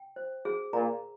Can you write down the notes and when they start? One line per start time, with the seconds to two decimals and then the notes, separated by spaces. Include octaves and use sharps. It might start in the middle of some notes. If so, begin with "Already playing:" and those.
Already playing: G5
0.16 C5
0.45 G#4
0.73 A#2 A#5